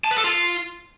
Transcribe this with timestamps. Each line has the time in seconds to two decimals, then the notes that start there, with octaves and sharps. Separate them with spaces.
0.04 A5
0.11 B4
0.18 A4
0.24 F4